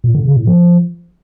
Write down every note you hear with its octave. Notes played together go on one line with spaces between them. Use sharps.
A#2
D3
C#3
A2
F3